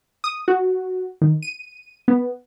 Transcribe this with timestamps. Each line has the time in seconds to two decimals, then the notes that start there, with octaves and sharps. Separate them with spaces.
0.24 D#6
0.48 F#4
1.22 D#3
1.42 D#7
2.08 B3